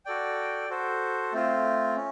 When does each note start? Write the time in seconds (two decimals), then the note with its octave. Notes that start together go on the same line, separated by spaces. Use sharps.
0.06 F#4 A4 D5 G5
0.69 F#4 A4 C5
1.33 A3 C4 F4
1.96 C#4